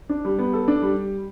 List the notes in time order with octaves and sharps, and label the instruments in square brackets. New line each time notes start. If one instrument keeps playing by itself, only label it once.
[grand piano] D4
G3
B3
A4
D4
G3